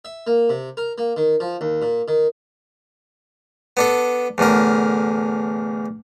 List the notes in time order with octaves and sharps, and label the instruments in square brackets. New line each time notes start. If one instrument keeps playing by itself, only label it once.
[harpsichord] E5
A#3
C3
A#4
A#3
D#3
F3
D#2
A#2
D#3
B3 D4 A4
E2 A2 D3 A#4